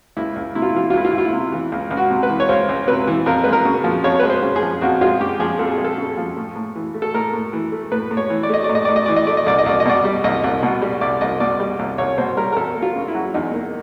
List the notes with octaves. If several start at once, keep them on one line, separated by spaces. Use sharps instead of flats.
C#2 E4
C#2
C3 E4
F4
E4
E3 F4
E4
F4
C#2 E4
F4
C#2 E4
F4
E4
C3
E3
C#2
C#2
F#4
C3
B4
E3
C#5
C#2 C5
C#2
C3 B4
E3
F2 A#4
G#3 B4
A#4
C#3
F3
F2 C#5
G#3 B4
C5
C#3
G#4
F3
F2 F#4
G#3 F4
C#3 G4
F3 G#4
F2 A4
G#4
G#3
A4
C#3
F3
A2
A2
E3
A3
A4
A2 A#4
A2
E3
A3
A2 B4
A2
C#5
E3
D5
A3 D#5
D5
A2
D#5
A2 D5
D#5
E3 D5
D#5
A3 D5
D#5
C2 D5
D#5
C2 D5
D#5
B2 D5
G3
C2 D#5
C2
B2
G3
C2 D5
C2 D#5
B2 D5
G3
C2
C2 C#5
B2 C5
G3 A#4
A#4
E2 A4
A#3
F4
C#3
E4
F#3
E2 D#4
A#3